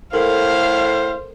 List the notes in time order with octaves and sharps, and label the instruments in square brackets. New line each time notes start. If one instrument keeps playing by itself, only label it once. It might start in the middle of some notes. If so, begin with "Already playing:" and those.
[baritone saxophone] A2 [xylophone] A4 A#4 [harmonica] C5 [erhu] F5